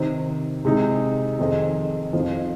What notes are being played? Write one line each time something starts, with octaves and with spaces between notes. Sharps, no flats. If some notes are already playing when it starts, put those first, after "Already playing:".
Already playing: C3 D#3 C4 D#4
C3 G#3 D#4
F2 D#3 C4 G#4 D#5
F2 F3 C4 D#4